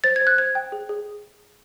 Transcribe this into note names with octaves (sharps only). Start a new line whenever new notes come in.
C5 A6
G#6
C5
F#6
C5 G#6
G5
G#4
G#4